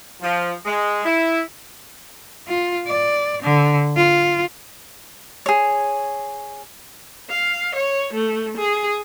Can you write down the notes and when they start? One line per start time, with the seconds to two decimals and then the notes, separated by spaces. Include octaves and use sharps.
0.22 F3
0.66 G#3
1.05 E4
2.48 F4
2.87 D5
3.42 D3
3.96 F4
5.46 G#4 C#5
7.30 F5
7.75 C#5
8.14 A3
8.57 G#4